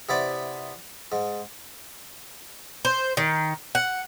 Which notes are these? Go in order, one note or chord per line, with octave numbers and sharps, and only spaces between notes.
C3 B3 E4 D5
G#2
C5
D#3
F#5